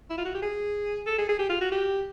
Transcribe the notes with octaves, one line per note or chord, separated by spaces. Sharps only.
E4
F4
F#4
G4
G#4
A4
G#4
G#4
G4
F4
F#4
G4